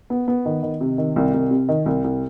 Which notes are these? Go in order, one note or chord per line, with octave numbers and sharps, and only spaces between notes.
B3
B3
D#3
D#3
C3
D#3
C2
C2
C3
D#3
C2
C2